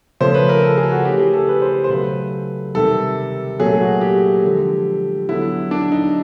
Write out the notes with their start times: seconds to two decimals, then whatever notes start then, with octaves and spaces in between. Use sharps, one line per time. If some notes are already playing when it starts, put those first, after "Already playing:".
0.21 C#3 F3 A3 C#4 C5
0.34 B4
0.49 A#4
0.63 A4
0.78 G#4
0.92 F#4
1.05 E3 A3 C#4 G4
1.19 G#4
1.34 A4
1.48 B4
1.62 C5
1.84 C5
1.89 C#3 F#3 A3 B4
2.75 C3 D#3 G3 A4
3.59 A#2 F#3 A3 C#4 G#4
3.81 F#4
4.01 G4
4.44 D3 F3 G#3
5.28 D3 F#3 B3 E4
5.71 D4
5.92 D#4